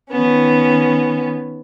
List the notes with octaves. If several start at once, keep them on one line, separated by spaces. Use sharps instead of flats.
D#3 B3 C#4